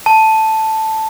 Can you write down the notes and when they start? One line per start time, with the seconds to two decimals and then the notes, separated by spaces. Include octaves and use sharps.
0.06 A5